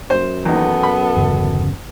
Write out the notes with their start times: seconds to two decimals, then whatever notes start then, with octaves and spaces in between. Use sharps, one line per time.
0.10 F#2 C5
0.45 E2 D#3 B3 A4
0.83 B5
1.17 G1 E2 C#3